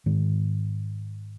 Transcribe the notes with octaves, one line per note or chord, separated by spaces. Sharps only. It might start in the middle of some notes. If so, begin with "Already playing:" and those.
G#2 D#3 G#3